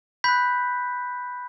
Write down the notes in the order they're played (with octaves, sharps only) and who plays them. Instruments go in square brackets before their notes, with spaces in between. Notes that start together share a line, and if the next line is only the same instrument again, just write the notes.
[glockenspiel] B5 F#6 G6 B6